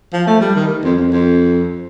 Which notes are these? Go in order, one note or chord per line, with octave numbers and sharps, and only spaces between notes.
F3
A3
G3
D#3
F2
F2
F2